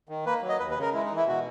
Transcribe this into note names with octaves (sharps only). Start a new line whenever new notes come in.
D#3
A#3 B4
F#3
D#5
D#2 B4
B4
C#3 A#4
G#3 E4
D#4
E3
E4
B2 F#4